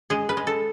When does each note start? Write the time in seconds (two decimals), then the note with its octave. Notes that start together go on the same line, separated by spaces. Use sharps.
0.10 G#3 G#4
0.29 B4
0.37 G#3
0.47 A4